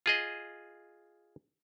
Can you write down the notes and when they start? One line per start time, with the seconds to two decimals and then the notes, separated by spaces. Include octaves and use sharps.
0.06 F4 G#4 D#5